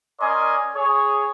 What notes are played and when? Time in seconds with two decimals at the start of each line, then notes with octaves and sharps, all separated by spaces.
0.20 C#4 A#4 D5 D#5 G#5 C6
0.75 G#4 C#5